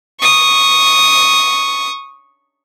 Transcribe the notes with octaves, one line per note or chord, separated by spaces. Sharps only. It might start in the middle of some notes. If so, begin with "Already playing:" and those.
C#6 D#6